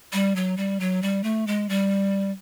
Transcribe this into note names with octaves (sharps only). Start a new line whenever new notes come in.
G3
F#3
G3
F#3
G3
A3
G#3
G3